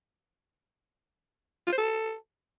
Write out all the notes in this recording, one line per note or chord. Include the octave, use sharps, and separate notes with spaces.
F4
C5
A4